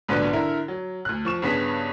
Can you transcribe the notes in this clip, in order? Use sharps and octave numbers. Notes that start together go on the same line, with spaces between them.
A#1 G#2 B2 D3 B4 D5
D3 E4 A#4
F#3
D2 F#6
F3 C#6 E7
G2 C#3 B3 G#4 B6